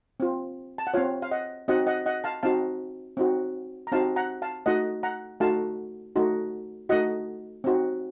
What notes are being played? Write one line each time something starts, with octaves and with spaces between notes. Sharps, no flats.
C4 F4
A5
F#5
C4 F4 C#5 F5
F5
D#5 F#5
C4 D#4 F#4 D#5 F#5
D#5 F#5
D#5 F#5
F5 A5
C4 D#4 F#4 F5 A5
C4 D#4 F#4
A#5
C4 D#4 F#4 F5 A5
F#5 A#5
F5 A5
A3 D#4 F#4 D#5 F#5
F#5 A#5
A3 D#4 F#4 F5 A5
A3 D#4 F#4
A3 D#4 F#4 D#5 F#5
C4 D#4 F#4